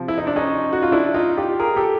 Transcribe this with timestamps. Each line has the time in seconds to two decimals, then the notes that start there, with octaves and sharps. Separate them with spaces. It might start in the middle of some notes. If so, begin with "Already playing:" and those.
Already playing: C3 F3
0.08 E4
0.18 D#4
0.27 D4
0.36 C#4 D#4
0.73 F#4
0.82 F4
0.92 D4 E4
1.14 D#4 F4
1.37 F4 G4
1.59 G#4 A#4
1.76 G4 A4